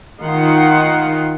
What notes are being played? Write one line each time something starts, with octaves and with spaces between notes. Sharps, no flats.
D#3 D#4 F4 F#5 C6